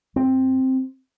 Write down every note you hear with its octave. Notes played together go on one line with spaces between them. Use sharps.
G2 C4